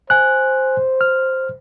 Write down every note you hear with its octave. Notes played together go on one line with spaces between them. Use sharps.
C5 G#5 F#6
F6